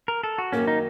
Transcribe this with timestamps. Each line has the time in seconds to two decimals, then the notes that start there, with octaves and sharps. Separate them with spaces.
0.08 A#4
0.23 A4
0.38 F#4
0.52 F#2 D#3 A#3 C#4
0.67 D#4